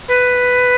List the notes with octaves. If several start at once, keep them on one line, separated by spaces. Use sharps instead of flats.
B4